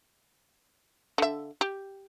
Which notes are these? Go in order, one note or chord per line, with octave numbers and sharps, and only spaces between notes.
D3 E5
G4